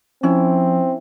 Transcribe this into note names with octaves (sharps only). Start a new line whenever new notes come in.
F3 C4 C#4 E4